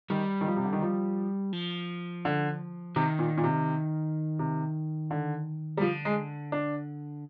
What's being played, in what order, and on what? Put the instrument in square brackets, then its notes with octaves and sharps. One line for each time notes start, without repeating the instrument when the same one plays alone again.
[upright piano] D#3 [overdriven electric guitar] G3
[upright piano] D#3
F3
C3
D3
D#3
F3
[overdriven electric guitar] F3
[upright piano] D3
[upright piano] C3 [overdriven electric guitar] D#3
[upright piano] A#2
A#2
C3
C3
D3
G3
[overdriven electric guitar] D3 [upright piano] F3
[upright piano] G#3
D4